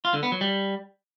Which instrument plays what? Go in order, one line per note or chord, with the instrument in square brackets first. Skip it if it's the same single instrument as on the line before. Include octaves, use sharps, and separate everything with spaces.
[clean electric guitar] F4
D3
B3
F#3
G3